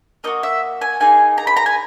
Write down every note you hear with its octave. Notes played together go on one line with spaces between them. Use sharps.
A#3 D#4 F#4 D#5
E5
G#5
A#3 D#4 G#4 G#5
A#5
B5
A#5
G#5